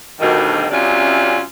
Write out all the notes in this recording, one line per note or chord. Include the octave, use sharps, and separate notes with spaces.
D2 G2 B2 D#3
F#2 C3 C#4 F4 D5